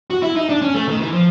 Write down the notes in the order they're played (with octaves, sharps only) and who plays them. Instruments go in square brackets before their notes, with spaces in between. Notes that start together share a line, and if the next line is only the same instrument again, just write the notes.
[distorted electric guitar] F#4
E4
D#4
D4
C#4
A3
D#3
E3
F3